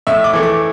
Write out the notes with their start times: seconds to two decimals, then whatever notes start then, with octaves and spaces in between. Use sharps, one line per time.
0.07 A2 E5
0.24 D6
0.33 E3 A3
0.43 D6